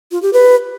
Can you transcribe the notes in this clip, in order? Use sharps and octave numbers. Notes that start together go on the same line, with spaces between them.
F4
G4
B4